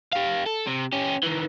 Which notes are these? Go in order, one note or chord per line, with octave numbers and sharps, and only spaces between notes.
G4 F5
A4
C3
C#4 G4
D#3 E3